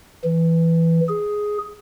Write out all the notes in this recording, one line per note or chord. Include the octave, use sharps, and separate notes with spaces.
E3
G#4